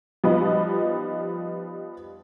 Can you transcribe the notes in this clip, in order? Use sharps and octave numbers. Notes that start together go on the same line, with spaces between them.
F3 G3 B3 D#4